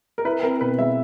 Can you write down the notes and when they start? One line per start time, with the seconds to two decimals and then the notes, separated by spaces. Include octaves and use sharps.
0.18 A#4
0.25 E4 B4
0.43 C4 A#4
0.61 B2 B4
0.79 G#3 E5